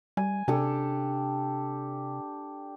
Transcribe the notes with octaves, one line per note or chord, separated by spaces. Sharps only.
G3 G#5
C3 D4 G4 A4